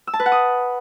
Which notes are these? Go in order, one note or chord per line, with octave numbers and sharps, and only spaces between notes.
E6
A5
B4
F#5
D#6